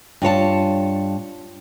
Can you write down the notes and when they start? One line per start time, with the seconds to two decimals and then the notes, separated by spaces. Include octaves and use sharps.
0.22 G2 F4 C#5 A5